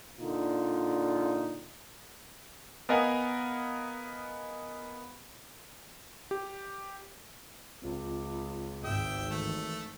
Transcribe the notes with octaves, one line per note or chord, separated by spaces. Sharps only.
A#2 D3 D#4 F4
B3 A#4 D#5 F5 F#5 G#5
G4
C#2 C4 F4
G#1 D2 G#4 E5 G5 D#6
D#3 E3 A3